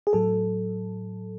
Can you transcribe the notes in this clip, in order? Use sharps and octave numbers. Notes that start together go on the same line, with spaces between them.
G#4
A2 F#3 A4